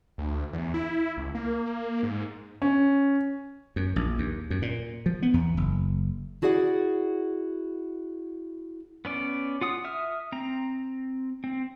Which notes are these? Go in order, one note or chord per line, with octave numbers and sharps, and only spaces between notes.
D2
E2
E4
C#2
A#3
G#2
C#4
F#2
A#1
D#2
F#2
A#2
F3
B3
E2
F#1
E4 F#4 G#4 D5 F#5
B3 C#4 D5
F4 F#5 D#6
E5 D#6 F6
C4 A#5
C4